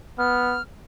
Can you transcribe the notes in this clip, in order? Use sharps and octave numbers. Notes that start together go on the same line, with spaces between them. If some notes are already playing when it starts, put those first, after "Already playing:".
B3 F6